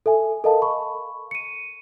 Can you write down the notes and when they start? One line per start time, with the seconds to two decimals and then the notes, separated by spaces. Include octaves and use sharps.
0.06 A4 E5 G#5
0.44 A4 A#4 D#5 F5 A5
0.62 B5 C#6
1.31 C#7 D#7